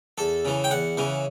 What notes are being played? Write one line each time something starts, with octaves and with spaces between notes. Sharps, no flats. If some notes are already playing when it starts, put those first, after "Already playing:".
E2 A4
C#3 E3
G5
E2 F#5
C#3 E3